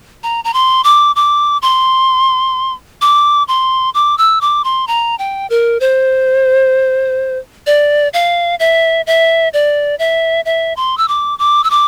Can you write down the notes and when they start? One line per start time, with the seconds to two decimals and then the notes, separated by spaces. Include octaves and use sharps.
0.23 A#5
0.44 A#5
0.54 C6
0.84 D6
1.16 D6
1.62 C6
3.01 D6
3.48 C6
3.95 D6
4.18 E6
4.41 D6
4.64 C6
4.88 A#5
5.19 G5
5.50 A#4
5.80 C5
7.67 D5
8.14 F5
8.60 E5
9.07 E5
9.54 D5
9.99 E5
10.46 E5
10.77 C6
10.98 E6
11.08 D6
11.39 D6
11.64 E6
11.70 D6